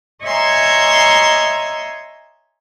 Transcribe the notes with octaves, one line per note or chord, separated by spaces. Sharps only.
C#5 D#5 E5 G#5 A#5 C6